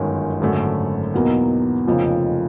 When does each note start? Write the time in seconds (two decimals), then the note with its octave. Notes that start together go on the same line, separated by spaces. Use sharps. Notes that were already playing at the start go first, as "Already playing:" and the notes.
Already playing: G1 F#2 D#3 G#3 C#4
0.41 G#1 F#2 D3 F#3 A3
1.14 E2 B2 F#3 A#3 D#4
1.87 F1 F2 C#3 F3 A#3